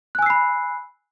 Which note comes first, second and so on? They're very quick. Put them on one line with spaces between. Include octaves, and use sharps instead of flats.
F#6 G#5 E6 C7 B5